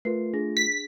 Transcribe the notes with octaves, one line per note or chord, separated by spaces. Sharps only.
A3 F4 A#4 B4 C7
D4 G#4 A#6
B6